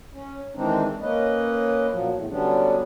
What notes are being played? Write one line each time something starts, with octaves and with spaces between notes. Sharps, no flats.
C#4
D#3 E3 G#3 C4 D4 D#4
A#3 C#4 B4 D#5
A#2 F3 F#3
E2 A2
D3 F#3 G3 B3 C#4 D4